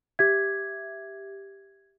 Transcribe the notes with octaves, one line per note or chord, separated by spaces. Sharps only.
G4 E5 G#6